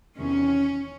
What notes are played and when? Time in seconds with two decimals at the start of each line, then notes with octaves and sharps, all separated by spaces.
0.17 E2 C3 D#3 C#4